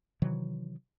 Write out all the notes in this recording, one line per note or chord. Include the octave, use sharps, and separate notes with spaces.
C3 D#3 E3 F#3